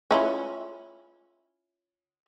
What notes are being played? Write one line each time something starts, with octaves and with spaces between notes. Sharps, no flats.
C#4 E4 F4